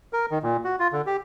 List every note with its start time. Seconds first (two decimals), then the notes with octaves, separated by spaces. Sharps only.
0.13 A#4
0.31 D#3
0.43 A#2
0.64 F#4
0.79 F4
0.93 D3
1.06 G4